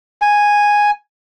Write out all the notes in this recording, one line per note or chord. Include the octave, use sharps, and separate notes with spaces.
G#5